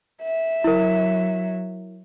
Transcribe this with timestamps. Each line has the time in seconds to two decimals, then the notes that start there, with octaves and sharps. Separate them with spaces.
0.23 E5
0.64 F#3 E4 A#4